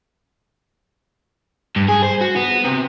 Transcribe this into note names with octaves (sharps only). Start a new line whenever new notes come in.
G2
G#4
C5
F#4
B3
C3